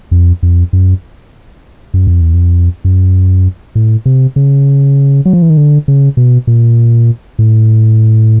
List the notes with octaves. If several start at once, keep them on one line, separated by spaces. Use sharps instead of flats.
F2
F2
F#2
F#2
F2
E2
F2
F#2
A2
C3
C#3
F#3
F3
E3
D#3
D3
C#3
B2
A#2
A2